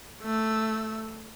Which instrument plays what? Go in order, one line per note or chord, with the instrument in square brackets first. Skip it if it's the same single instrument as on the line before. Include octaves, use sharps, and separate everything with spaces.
[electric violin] A3 E6